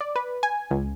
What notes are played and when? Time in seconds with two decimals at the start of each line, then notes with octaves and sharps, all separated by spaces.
0.01 D5
0.16 B4
0.43 G#5
0.71 C#2